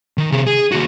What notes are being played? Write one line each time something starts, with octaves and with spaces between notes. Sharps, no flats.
D#3
C3 G#4
G#4
D#2 F#4